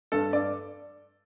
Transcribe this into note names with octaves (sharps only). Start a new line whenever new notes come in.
G2 A4
G2 D5